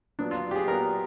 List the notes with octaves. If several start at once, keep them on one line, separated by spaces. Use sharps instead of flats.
A#2 F#3 B3 D4
F4
G4
G#4
A#2 F#3 B3 A#4